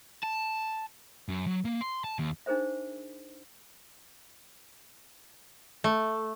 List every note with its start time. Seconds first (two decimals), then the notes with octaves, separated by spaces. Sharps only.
0.23 A5
1.29 F#2
1.47 F#3
1.65 A#3
1.81 C6
2.04 A5
2.19 D#2
2.46 D4 D#4 G#4 A#4 C5 E5
5.84 A3